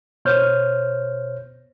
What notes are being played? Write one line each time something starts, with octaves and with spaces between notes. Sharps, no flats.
B2 C5 C#5 F6 G6